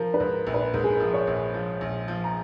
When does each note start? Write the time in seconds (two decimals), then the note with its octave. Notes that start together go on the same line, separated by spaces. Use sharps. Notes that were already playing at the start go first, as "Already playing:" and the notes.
Already playing: F3 A#4
0.14 B4
0.20 G#2
0.33 A#4
0.47 A#1
0.54 B4
0.74 G#2 A#4
0.84 G#4
0.96 F3 A#4
1.14 C#5
1.27 A#1
1.54 F3
1.81 A#1
2.08 F3
2.24 A#5